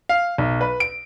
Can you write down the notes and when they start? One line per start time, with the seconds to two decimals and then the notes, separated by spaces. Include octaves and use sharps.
0.09 F5
0.38 B1
0.61 B4
0.80 D7